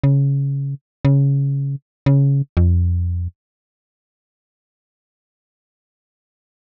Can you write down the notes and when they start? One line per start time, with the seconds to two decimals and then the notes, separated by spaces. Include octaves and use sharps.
0.04 C#3
1.05 C#3
2.06 C#3
2.57 F2